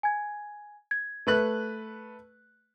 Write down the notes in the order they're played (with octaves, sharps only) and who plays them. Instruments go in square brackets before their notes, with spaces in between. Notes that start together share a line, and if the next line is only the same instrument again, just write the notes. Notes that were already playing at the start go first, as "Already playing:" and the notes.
[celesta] G#5 G#6
G#6
[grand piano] A3 B4 F#6